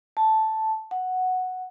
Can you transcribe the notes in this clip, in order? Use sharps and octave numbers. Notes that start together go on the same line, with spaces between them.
A5
F#5